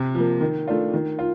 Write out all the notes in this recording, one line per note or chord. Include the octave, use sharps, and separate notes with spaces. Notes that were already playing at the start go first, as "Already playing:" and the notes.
Already playing: C3
F3 A#3
D#3
A3 D4 F4
D#3
F4